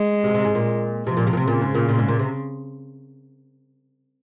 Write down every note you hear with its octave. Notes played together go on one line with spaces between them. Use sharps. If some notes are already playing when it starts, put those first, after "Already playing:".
Already playing: G#3
C3
C3
G#2
A#2
C3 F3
A#2
C3
A#2
C3
A#2 C#3
G#2
A#2
A#2
G#2
A#2
C3